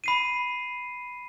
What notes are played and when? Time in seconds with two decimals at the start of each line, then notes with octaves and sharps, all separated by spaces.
0.04 B5 C7 D#7